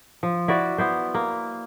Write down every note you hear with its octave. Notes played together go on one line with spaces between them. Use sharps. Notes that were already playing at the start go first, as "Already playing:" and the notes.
F3
E4 F#4 D5 E5
B3 E4 C5
A#3